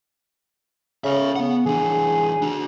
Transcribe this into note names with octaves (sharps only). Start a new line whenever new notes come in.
C#3 C#5 E5
B3 F#5
E3 D4 G#4
D4 F#4